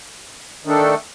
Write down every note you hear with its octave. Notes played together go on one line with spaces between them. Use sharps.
D#3 A3 D4 A4